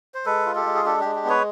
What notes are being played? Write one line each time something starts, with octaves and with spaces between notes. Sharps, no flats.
C5
G#3 A4 B4
F4
G4 A4
G#3
G#4
D4 G4 A4
G#3 G4
G4
B3 B4 C#5